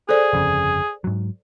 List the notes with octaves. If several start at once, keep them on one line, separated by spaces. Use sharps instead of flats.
G#4 A4 C5 D5
G1 F2 C#3
G#2 F#3